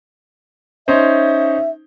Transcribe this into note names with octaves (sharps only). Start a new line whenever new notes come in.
C#4 D#4 C5 E5